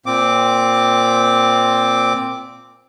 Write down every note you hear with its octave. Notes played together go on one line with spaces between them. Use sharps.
A#2 C4 D6